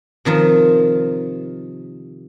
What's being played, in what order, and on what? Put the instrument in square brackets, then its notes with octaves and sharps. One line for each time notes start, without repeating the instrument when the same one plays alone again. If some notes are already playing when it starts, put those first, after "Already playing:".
[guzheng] C3 D#3 F3 A#4